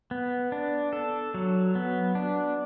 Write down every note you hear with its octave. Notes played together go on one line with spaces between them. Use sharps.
B3
D4
A4
F#3
B3
D4